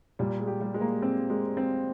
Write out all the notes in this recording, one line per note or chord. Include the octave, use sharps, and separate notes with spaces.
A#2 G3
G#3
G4
G3
G#3
A#3
C4
G#3
C4